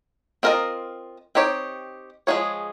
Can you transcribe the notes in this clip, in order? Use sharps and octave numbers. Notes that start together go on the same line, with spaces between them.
C4 F4 A#4 D#5
C4 D#4 G4 C#5
F3 G#3 D#4 G#4 C#5